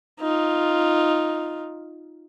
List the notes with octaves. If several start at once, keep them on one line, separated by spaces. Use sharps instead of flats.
D#4 F4